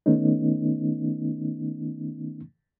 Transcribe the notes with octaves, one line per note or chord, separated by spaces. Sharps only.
D#3 A3 B3 C#4 D#4